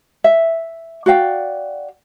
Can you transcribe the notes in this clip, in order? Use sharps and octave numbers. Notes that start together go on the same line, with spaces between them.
E5
F#4 D5 F5 G5